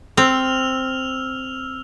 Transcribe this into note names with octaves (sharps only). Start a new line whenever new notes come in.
C4 E6 F6 F7